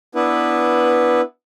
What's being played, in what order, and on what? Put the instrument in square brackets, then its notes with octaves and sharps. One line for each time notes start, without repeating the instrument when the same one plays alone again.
[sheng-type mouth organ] B3 D4 E4 B4